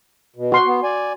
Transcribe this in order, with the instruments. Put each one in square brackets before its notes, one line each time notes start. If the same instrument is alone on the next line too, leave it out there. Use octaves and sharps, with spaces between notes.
[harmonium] B2
[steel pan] F#4 C6
[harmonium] B3
D5 G#5